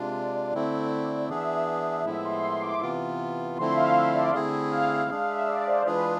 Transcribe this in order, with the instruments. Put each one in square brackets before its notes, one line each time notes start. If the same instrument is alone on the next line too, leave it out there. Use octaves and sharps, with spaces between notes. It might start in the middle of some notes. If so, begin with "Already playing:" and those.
Already playing: [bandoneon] C3 G#3 D4 F4 [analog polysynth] D5
[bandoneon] D3 A3 C4 E4
[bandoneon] E3 B3 D4 G#4 [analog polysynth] E5
[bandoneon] A2 F3 G#3 B3 E4 [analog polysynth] E5
[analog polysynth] C6
C6
D6
[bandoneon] C3 E3 B3 F4
[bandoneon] D3 F3 A3 C4 E4 [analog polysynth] C6
[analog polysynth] E5
F5
E5
D5
[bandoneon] D3 A3 C4 E4 G#4
[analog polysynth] F5
[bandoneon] G#3 D4 G#4 [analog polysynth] F5
[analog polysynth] E5
D5
C5
[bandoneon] E3 G#3 D4 F4 G#4 [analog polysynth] B4